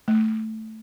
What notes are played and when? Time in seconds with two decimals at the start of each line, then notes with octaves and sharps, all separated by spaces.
0.08 A3